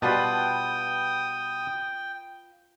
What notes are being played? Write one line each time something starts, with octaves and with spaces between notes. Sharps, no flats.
B2 G3 F4 B4 G5 A5 D#6